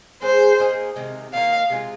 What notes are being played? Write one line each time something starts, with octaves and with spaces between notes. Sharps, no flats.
G#3 C4 G#4 C5
A#3 D#4 G#4
C3 D#3 G#3
D#3 A#3 D#4 A#4 F5
C3 G#3 F4